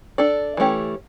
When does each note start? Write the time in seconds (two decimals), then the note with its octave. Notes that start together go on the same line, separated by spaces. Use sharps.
0.18 D4 A4 D5
0.57 E3 A3 C#4 G4